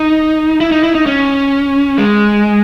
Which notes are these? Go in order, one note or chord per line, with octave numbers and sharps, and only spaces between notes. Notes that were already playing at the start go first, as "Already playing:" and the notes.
Already playing: D#4
E4
D#4
E4
D#4
C#4
G#3